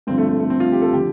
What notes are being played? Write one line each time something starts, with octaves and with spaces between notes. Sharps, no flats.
G2 D3 F3 C4
A3
A3
A3
C4
F4
G4
A4
D3 F3 G4